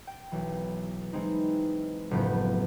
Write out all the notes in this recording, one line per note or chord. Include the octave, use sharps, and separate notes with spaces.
G5
B1 E3
E3 G#3 C4 D#4
F#1 A2 F3 B3 G6